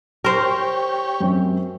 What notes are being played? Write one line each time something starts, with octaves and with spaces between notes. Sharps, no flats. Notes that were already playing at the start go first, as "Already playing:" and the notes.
G4 A#4 C5 C#5
F#2 C4 C#4